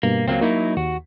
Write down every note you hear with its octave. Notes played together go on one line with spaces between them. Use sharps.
G2 B2 A#3
C#2 F#3 A#3 C4 F5
F#3 A#3 D#4 E4
D#2 F#4